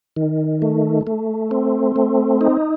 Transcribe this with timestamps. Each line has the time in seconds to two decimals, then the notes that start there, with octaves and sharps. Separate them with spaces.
0.16 D#3
0.62 A3
1.07 A3
1.51 C4
1.96 A3
2.41 D#4